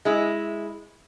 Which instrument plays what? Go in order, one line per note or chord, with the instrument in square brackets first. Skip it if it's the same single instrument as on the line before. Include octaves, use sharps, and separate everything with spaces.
[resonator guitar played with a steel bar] G#3 E4